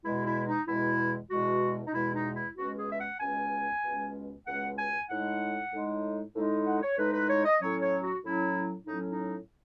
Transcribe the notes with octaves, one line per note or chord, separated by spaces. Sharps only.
E2 B2 G#3 E4
E4
D#4
E2 B2 G#3 E4
E2 B2 G#3 F#4
D#4
E2 B2 G#3 E4
D#4
E4
C#2 B2 G#3 C#4 F#4
G#4
E5
F#5
C#2 B2 G#3 C#4 G#5
C#2 B2 G#3 C#4
C#2 B2 G#3 C#4 F#5
G#5
A2 G#3 D#4 F#5
A2 G#3 D#4
A2 G#3 D#4
F#5
C#5
A2 G#3 D#4 B4
B4
C#5
D#5
A2 F#3 C#4 C#5
C#5
F#4
A2 F#3 C#4 E4
A2 F#3 C#4 D#4
D#4